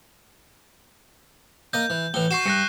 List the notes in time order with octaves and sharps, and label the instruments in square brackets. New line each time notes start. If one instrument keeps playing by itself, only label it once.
[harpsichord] A#3 D#5 [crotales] G6
[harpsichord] E3
[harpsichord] A2 E3 [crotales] G7
[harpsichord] F#4 [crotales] C#6 C7 E7
[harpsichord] G2 [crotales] F#6 A#6 C#7